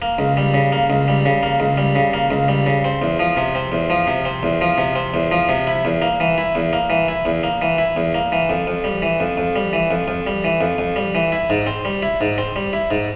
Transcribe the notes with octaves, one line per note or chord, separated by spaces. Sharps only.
A#3
C#2
G3
C#3
A#3
C#2
G3
C#3
A#3
C#2
G3
C#3
A#3
C#2
G3
C#3
C4
E2
F3
C3
C4
E2
F3
C3
C4
E2
F3
C3
C4
E2
F3
C3
E4
E2
A#3
E3
E4
E2
A#3
E3
E4
E2
A#3
E3
E4
E2
A#3
E3
F2
F2
G3
E3
F2
F2
G3
E3
F2
F2
G3
E3
F2
F2
G3
E3
E4
G#2
C4
G3
E4
G#2
C4
G3
E4
G#2